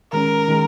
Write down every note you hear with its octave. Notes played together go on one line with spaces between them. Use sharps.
D#3 G#3 C#4 A#4
D#3 G#3